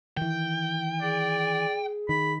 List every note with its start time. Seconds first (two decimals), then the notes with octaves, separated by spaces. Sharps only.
0.17 D#3 E3 G5
1.02 G#4 D5
2.09 D#3 B5